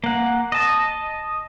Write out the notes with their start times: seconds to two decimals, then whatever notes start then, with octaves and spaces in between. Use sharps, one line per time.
0.04 A#3 F#5
0.52 D#5 A5